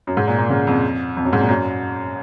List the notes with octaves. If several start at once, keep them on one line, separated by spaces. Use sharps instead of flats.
F#2
G#2
A#2
A#2
C#3
F2
F2
F#2
G#2
A#2
F#2